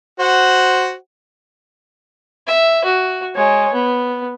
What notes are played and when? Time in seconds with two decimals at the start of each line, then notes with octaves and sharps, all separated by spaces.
0.20 F#4 C5 F#5
2.47 E5
2.85 F#4
3.35 G#3 C#5
3.74 B3